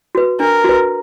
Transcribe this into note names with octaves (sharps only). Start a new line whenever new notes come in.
F#4 B4
D4 A#4
F#4 B4